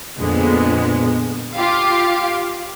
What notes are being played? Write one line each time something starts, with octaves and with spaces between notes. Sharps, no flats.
F2 A#2 D3 G#3 B3
F4 G4 F5